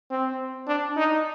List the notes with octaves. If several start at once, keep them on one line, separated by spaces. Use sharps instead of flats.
C4
D4
D#4